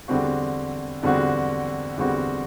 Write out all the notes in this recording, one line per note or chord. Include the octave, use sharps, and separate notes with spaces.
E2 D3 G3 C4 F#4
E2 D3 G3 C4 F#4
E2 D3 G3 C4 F#4